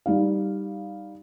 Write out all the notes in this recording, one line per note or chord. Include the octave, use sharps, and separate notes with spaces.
G3 D#4 F5